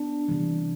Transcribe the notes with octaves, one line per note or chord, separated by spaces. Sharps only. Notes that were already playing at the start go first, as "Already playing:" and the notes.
Already playing: B3 D4
C3 E3 G3